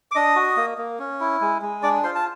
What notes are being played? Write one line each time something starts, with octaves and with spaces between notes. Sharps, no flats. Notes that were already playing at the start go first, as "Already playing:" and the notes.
D6
D4 D#5 D#6
F#4
A#3
A#3
C#4
E4
G#3
G#3
D4 D5 D6
F4 C5 C6
A5